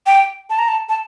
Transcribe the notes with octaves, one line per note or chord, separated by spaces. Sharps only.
G5
A5
A#5
A5
A5